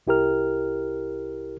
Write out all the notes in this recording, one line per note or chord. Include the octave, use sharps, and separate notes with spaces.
C2 E4 G4 A#4 F6